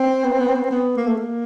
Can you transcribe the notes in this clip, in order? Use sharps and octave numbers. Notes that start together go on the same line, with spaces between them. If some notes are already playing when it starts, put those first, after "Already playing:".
Already playing: C4
B3
C4
B3
C4
B3
C4
B3
A#3
A3
A#3